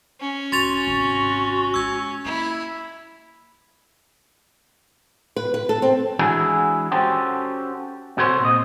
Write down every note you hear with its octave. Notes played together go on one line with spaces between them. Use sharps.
C#4
E1 F#4 C6 A6 F7
G#1 C3
G#3 E6 G#6
A#3 E4
B4
B4
A4
C4
E3 G#3 D4 E4 F#4 G#4
C#4 F#4 G4 A4 C5
C3 F#4 A4 C5 C#5 C6
A#2 C4 D#5